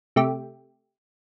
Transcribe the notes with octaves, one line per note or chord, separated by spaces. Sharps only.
C3 A3 G4